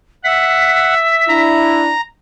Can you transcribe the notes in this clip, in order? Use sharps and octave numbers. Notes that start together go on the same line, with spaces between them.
E5 F#5 B6
D4 E4 A#5